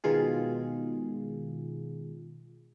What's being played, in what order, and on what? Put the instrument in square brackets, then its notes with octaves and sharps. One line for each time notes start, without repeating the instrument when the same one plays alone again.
[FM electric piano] B2 D#3 G#3 F4 G#4